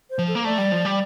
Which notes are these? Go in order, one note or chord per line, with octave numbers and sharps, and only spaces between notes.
C5
F3
A4
A#3
A3 D5
G3
F3
G3